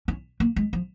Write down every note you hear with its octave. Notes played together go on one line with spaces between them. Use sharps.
C#4
A#3
G#3
F3